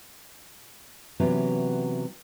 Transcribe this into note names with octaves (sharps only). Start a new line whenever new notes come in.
C3 E3 F#3 B3 C#4